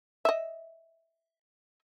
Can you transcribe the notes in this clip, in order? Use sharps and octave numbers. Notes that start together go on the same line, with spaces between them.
D#5 E5